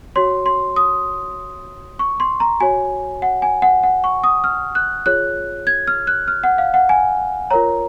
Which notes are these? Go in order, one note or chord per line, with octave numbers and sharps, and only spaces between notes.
F#4 C#5 C6
C6
D#6
C#6
C6
A#5
F#4 C#5 G#5
F#5
G#5
F#5
F#5
C#6
D#6
F6
F#6
F4 G#4 C#5 F#6
G#6
F6
F#6
F6
F#5
F5
F#5
G#5
F4 A#4 C#5 A#5